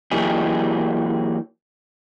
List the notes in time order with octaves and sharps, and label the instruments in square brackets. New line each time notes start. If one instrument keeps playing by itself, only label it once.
[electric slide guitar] E3 F#3 A#3 D#4 G4 G#4